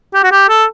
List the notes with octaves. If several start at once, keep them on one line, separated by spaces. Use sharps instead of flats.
G4
F#4
G4
A4